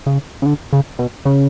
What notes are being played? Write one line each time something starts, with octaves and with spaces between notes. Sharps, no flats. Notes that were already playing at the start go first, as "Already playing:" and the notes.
C#3
C#3
D3
C#3
B2
C#3